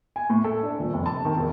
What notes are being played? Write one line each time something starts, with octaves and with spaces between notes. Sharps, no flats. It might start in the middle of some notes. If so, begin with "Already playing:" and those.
G#5
A2
A4
D4
D#1
F1
A5
D#3
E1